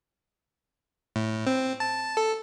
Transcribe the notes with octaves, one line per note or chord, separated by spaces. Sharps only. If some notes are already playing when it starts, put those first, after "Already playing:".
A2
C4
A5
A4